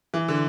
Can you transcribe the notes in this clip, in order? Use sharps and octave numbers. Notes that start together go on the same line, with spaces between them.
E3
D3